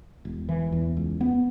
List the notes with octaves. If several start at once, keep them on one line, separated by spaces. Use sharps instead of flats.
E1
E3
E2
C#2
B3